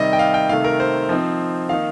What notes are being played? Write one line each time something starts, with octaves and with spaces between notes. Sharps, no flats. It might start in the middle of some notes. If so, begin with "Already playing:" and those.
Already playing: C3 D#3 G3 D#5
G5
F5
G5
C3 D#3 A3 F5
A#4
C5
F3 C4 D#4
D#3 A#3 D#4 F5